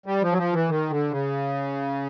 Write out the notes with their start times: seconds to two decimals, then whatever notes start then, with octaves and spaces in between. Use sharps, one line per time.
0.06 G3
0.22 F3
0.32 F#3
0.38 F3
0.53 E3
0.69 D#3
0.90 D3
1.11 C#3